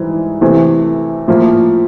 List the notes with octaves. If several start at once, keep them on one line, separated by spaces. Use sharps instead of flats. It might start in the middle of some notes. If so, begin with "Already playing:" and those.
Already playing: G#2 E3 G3
C3 E3 A3
A2 F3 A#3